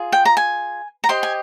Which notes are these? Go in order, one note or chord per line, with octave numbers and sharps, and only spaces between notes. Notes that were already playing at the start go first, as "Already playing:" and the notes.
Already playing: F4 G#4
G5
A#5
G#5
A#5
G4 C5 D#5 C6
G#5